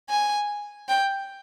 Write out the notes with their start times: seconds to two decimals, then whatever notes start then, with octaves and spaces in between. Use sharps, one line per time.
0.09 G#5
0.89 G5